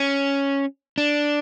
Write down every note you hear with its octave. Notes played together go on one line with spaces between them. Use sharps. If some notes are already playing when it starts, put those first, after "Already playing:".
Already playing: C#4
D4